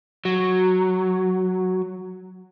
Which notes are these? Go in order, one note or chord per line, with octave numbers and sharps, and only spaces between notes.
F#3